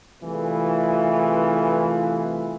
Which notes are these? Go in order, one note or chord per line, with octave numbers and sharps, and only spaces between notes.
C2 E3 A3 F4 G#4 B4